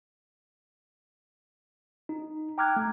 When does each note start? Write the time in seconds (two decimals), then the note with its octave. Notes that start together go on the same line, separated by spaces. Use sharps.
2.09 D#4
2.58 G5 A#5 D6 F6 F#6 G#6
2.76 A3